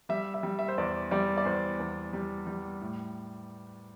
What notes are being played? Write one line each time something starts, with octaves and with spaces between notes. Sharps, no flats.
G3 E5
E5
G3
E5
C5
E2 D5
G3 D5
D5
E2 C5
E2
G3
G3
A2